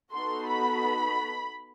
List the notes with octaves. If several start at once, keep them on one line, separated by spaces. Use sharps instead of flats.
B3 D#4 F#4 A4 C6
B5